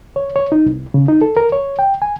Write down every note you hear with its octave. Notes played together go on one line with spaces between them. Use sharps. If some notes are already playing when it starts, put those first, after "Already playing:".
C#5
C#5
D#4
C2
C#3
D#4
A4
A#4
C#5
G5
G#5